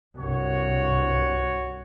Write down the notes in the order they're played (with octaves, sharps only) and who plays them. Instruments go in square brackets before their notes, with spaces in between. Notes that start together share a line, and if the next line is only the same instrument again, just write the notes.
[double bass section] C2 G2 [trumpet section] F#4 C#5